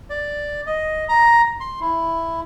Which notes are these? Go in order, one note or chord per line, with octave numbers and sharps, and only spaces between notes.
D5
D#5
A#5
C6
E4